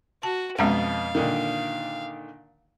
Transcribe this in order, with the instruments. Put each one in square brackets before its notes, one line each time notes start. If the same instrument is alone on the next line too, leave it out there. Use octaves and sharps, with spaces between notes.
[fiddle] F#4 [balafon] A5
[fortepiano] F2 B2 [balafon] G#3 C#4 F#5 [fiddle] F5
[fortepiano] A#2 D3 D#3